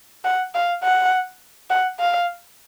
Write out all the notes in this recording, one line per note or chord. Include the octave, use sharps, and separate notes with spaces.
F#5
F5
F#5
F#5
F5